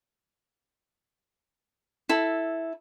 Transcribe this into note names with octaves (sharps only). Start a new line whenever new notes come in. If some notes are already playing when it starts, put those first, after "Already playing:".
E4 A4